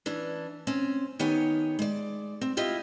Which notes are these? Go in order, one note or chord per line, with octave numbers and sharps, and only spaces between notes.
E3 C#4 D4
C4 C#4
D#3 B3 G4 C#5 G#5
G#3 D5
C4
E4 F4 G4 D#5